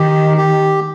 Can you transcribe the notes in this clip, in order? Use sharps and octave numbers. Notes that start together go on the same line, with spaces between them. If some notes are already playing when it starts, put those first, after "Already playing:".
Already playing: D#3 G4
G4